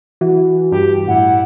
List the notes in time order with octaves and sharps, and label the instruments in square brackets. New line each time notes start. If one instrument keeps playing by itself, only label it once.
[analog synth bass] E3 [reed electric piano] F#4
[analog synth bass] G2 [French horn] G4
[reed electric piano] A2 [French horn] E4 [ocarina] F#5